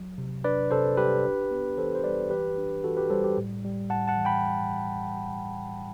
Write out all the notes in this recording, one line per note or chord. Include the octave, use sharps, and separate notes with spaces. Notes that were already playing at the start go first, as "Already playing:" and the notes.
Already playing: F#3
C3
D4 B4 D5
C3 A4 C5
G3 G4 B4
D4
B3
E3 A4 C5
C5
G3 B4 D5
E3 G4 B4
D4
E3 F#4 A4
G4 B4
G3 A4 C5
G4
A2
G3
A2 F#5 A5
F#5 A5
E3
G5 B5